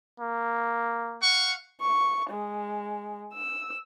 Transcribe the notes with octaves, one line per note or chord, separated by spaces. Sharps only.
A#3
F5 F#5 C#6
C#6
G#3
E6